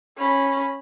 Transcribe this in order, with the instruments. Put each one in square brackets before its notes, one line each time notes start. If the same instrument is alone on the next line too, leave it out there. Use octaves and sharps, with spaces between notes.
[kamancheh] C#4 B5